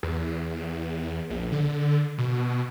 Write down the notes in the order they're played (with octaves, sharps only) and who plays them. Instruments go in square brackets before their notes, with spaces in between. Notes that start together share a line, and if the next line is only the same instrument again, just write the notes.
[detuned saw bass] E2
A#1
D3
B2